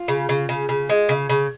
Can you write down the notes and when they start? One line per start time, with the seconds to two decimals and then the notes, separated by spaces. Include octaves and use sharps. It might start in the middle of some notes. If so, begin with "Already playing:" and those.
Already playing: F4
0.08 C#3
0.29 C#3
0.49 C#3
0.69 C#3
0.89 G#3
1.09 C#3
1.29 C#3